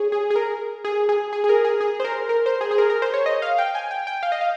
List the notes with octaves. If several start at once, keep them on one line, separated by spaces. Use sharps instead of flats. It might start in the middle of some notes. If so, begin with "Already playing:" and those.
Already playing: G#4 C#5
G#4
G#4
A#4
G#4
G#4
G#4
G#4
A#4
G#4
G#4
C5
A#4
A#4
C5
G#4
G#4
A#4
A#4
C5
C#5
D#5
F5
G5
G#5
G5
G5
F5
D#5
F5